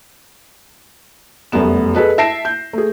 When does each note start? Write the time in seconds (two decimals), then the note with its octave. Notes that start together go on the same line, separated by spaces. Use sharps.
1.52 F1 F#2 G3 A3 B3 E7
1.95 G#4 A4 B4 D#5
2.18 E5 A5 A#6 C7 D7 E7
2.45 G6
2.73 A3 G#4